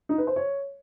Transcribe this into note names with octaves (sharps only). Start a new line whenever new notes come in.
D#4
B4
C5
C#5